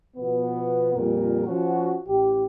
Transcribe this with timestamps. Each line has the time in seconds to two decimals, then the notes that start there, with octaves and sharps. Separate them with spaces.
0.17 B2 F3 B3
0.94 F2 A#2 G3 A#4
1.45 F3 C#4 F#4
2.07 A1 G4